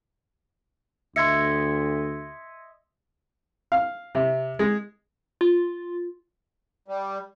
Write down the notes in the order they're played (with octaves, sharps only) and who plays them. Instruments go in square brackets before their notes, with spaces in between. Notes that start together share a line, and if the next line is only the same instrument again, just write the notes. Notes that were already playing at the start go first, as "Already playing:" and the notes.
[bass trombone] D2 [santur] D#5 E5 [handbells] C6 G#6 C#7
[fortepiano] F5
C3
G#3
[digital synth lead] F4
[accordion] G3